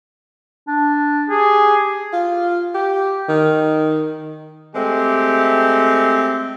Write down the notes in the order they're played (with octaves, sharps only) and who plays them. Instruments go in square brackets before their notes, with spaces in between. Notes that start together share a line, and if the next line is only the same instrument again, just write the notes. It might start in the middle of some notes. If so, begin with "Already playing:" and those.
[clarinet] D4
[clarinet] G4 [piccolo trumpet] G#4
[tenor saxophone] F4
G4
D#3
[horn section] G#3 A3 C4 G4